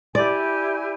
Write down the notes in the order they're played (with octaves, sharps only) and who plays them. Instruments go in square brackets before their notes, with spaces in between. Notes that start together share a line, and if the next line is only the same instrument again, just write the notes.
[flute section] E4 G4 G#5 [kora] D5